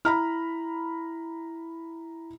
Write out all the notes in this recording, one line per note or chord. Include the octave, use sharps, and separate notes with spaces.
E4 A#5 B5 F6